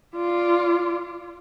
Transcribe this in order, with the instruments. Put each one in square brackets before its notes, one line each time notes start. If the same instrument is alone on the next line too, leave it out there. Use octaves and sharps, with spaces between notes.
[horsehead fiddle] F4 D5